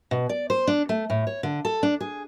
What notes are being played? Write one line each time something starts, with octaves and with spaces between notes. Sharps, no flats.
B2
D5
C5
D4
A3
A2
C#5
D3
A4
D4
G#4